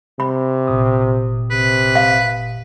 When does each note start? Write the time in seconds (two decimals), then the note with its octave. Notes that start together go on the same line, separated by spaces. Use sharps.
0.20 C3 B5
0.68 G1 A#2 D#6
1.51 C3 B4
1.96 F5